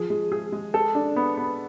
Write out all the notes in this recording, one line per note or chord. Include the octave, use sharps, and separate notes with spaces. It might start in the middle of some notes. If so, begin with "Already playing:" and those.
Already playing: F3 G#4
G#3
G#4
G#3
A4
D4
B3
B3